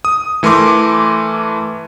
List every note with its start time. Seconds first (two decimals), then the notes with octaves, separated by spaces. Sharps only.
0.05 D#6
0.43 E3 A3 A#4 C6 D6